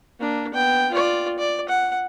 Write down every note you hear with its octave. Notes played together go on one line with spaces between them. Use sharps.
A#3 D4
B3 G5
F4 D5
D5
F#5